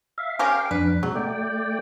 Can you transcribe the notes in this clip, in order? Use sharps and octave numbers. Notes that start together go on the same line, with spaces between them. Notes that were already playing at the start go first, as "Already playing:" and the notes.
E5 F5
C#4 G4 A#4 F5 G5
F2 D4 B4
B2 F#3 G#3
A3 D5 G5